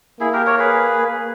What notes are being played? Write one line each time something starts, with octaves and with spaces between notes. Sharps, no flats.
A#3 E4 G#4
G4 A#4
A#4 C#5
G#4 B4